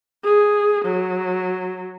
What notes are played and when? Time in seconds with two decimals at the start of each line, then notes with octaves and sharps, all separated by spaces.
0.24 G#4
0.85 F#3